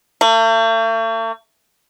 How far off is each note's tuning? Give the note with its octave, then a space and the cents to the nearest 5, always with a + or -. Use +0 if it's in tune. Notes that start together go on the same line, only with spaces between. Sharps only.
A3 +45